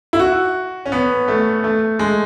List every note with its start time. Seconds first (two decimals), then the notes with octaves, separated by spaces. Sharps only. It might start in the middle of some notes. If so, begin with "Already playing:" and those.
0.13 E4
0.19 F#4
0.86 C#4
0.92 B3
1.28 A3
1.64 A3
1.99 G#3